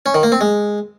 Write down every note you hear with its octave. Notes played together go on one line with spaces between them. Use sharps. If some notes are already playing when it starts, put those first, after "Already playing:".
C#4
D#3
A#3
C4
G#3